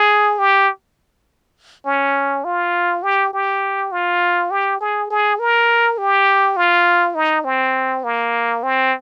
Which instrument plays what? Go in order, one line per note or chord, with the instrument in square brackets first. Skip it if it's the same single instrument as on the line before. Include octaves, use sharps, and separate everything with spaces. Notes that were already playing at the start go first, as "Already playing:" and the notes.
Already playing: [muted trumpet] G#4
G4
C#4
F4
G4
G4
F4
G4
G#4
G#4
A#4
G4
F4
D#4
C4
A#3
C4